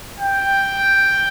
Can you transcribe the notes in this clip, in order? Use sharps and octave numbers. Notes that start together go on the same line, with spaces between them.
G5